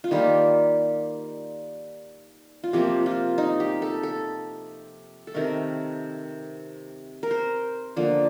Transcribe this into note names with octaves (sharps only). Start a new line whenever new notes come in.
F4
D#3 G3 A#3 G4
F4
C3 F3 A#3 G4
F4
D#4
G4
A4
A4
A4
C3 D#3 A3 A#4
A#4
C5
D3 F3 A#3